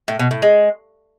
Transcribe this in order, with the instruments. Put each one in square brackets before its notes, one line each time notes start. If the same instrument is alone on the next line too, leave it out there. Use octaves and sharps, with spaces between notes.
[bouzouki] A2
B2
A2
G#3